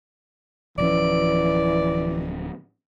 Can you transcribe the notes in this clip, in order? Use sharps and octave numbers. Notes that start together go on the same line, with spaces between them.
D1 E3 F3 C#4 D5